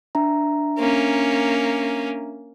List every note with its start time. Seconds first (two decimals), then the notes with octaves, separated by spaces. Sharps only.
0.15 D4 E5 A#5
0.78 A#3 C#4